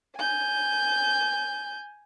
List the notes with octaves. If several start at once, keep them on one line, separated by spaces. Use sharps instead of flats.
G#5 G6